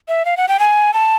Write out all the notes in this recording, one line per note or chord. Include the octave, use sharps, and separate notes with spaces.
E5
F5
F#5
G5
G#5
A5